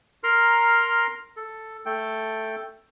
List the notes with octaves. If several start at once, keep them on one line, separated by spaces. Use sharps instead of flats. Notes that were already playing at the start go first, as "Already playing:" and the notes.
A#4 A#5 C6 F6
A4
A3 A4 G5